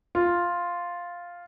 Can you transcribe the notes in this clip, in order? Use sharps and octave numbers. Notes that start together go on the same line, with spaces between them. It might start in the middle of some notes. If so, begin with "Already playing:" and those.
F4